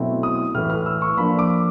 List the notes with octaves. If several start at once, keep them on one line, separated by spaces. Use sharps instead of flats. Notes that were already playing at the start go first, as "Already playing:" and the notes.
Already playing: B2 F#3 A3 C4 E4
D#6
A2 E3 A3 F6
F6
E6
C#6
F3 A#3 D4 B5
D6